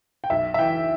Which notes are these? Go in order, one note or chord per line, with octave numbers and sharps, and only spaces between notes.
G5
B1 E5
E5
E3 G5